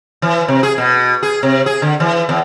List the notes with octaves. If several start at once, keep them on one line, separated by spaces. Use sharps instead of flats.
E3
C3
G#4
B2
G#4
C3
G#4
D3
E3
E2